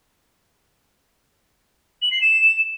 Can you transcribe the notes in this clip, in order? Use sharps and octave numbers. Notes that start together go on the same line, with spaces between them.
F#7
C7
E7